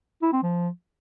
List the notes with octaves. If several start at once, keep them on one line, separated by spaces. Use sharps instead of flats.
E4
C4
F3